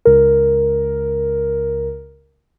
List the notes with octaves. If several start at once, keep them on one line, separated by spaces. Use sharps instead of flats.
C#2 A#4